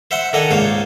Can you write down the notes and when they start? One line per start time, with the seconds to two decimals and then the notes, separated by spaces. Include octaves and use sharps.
0.11 C5 E5 F#5 C6
0.33 D#3 D4 A4 D#5 F#5 G#5
0.51 C#2 G#2 A#3 C5 C#5